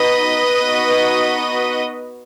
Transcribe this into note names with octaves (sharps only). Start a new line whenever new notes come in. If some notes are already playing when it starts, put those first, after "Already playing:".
Already playing: B3 D#4 F#4 B4 D#5
B3 D#4 F#4